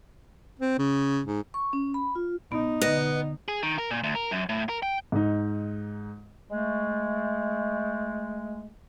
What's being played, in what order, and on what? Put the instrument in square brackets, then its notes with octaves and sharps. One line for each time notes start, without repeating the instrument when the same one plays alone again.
[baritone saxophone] C4
C#3
G#2
[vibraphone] C#6
C#4
B5
F4
[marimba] B3 [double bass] D#4
[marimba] D3 D#5 A#6 [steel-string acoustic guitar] B3
[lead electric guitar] G#4
D#3
A#4
A#2
D2
A#4
F#2
A2
A#4
G5
[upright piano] G#2 D#4
[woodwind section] G#3 A3